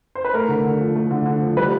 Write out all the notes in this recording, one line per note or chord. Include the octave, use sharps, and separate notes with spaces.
C5
B4
A3 A#4
D3
D3
F3
A3
D3
D3
F3
G3 B4